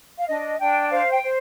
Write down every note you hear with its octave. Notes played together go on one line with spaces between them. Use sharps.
F5
D4 D#5
D4 G5
C5 F5
G5
C5